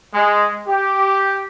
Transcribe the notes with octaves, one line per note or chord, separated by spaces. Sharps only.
G#3
G4